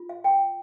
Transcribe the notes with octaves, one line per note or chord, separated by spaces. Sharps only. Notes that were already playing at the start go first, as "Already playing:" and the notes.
Already playing: F4
F5
A4 G5